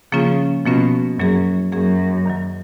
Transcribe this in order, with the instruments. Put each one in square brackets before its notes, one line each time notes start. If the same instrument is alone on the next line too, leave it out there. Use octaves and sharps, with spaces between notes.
[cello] C#3 [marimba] F3 A#3 C#4 F4
[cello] B2 [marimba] F3 A#3 C#4 F4
[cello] F#2 [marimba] F#3 A#3 C#4 G#4
[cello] F#2 [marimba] F#3 A#3 C#4 G#4
[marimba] F#2 D#3 F#3